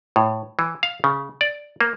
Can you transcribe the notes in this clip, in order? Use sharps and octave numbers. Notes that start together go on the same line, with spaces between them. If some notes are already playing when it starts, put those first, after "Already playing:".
A2
E3
F5
C#3
D5
A#3